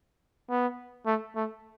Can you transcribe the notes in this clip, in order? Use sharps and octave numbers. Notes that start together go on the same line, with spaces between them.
B3
A3
A3